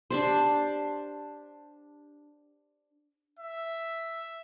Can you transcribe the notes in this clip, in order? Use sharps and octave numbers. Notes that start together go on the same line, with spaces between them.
D4 G4 C5
E5